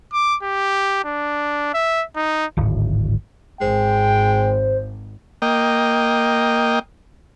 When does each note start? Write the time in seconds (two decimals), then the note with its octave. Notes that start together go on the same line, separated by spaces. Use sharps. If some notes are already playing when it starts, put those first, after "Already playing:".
0.13 D6
0.43 G4
1.05 D4
1.74 E5
2.16 D#4
2.57 D1 G#1
3.61 G#1 G#3 C5 G5
5.42 A#3 D#5 G5